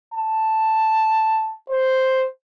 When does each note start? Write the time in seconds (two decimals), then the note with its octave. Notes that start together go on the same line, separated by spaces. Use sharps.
0.14 A5
1.70 C5